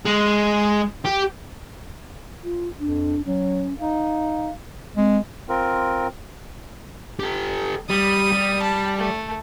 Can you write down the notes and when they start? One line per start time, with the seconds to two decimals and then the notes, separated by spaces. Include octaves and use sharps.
0.06 G#3
1.05 G4
2.44 F4
2.80 F2 D4
3.26 F#3 C#4
3.79 D#4 F5
4.97 G#3 C4
5.49 C4 F4 A#4
7.20 G4 A4
7.89 G3 D#6
8.32 G3
8.62 A5
8.98 A3